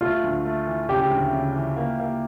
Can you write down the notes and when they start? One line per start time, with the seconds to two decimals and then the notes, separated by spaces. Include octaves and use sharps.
0.01 A3 F4
0.23 D2
0.45 A3
0.67 E3
0.89 C#3 G4
1.11 D2
1.33 C#3
1.56 E3
1.77 A#3
2.00 A#3